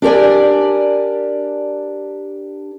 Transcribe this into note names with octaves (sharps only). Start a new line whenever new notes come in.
D4 G4 A#4 D5 G#5